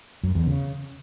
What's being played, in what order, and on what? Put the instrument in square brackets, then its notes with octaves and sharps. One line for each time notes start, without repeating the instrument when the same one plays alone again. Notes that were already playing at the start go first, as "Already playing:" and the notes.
[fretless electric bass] F#2
E2
C#3